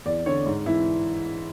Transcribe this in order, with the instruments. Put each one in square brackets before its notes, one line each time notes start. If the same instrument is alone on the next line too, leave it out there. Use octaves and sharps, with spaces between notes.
[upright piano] E2 D5
D3 C#5
G#2
E3 E4